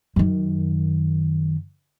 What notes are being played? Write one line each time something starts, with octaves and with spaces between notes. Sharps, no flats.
F#2 D#3